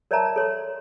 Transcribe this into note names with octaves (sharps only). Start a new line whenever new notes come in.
A#4 C#5 D5 E5 A5 A#5
A4 C#5 C6